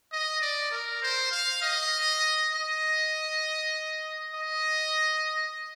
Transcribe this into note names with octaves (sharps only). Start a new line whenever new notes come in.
D#5
D5
A#4
C5
F5
D#5
D#5
D#5